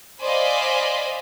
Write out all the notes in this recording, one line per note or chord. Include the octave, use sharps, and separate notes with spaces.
C5 D5 D#5 F5 G#5 B5